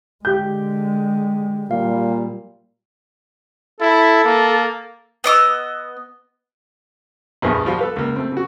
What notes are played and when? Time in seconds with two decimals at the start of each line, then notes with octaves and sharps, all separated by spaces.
0.25 D3 G#3 G4 G6
1.71 A#2 G3 F5
3.81 E4 A4
4.24 A#3
5.24 B3 D#5 D6 E6
7.42 A#1 E2 G2 F3 B3 G#4
7.66 F3 G3 F4 F#4
7.79 A4 B4 F5
7.96 C#2 A#3
8.16 A3 C4
8.32 C#3 F#4